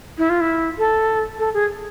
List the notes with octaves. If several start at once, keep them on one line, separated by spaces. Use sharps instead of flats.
E4
F4
E4
A4
A4
G#4